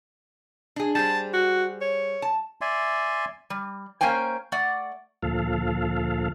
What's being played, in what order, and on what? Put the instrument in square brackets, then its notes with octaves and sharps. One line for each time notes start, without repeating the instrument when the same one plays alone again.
[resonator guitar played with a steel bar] D4 G#4
[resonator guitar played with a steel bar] G3 G#4 C5 [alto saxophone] A5
[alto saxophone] F#4
C#5
[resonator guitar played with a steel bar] A5
[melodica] D5 E5 G#5 C6
[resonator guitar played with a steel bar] G3
A#3 C#4 C5 G5 G#5
A3 D5 F#5
[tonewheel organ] D2 A#2 F3 A4 F5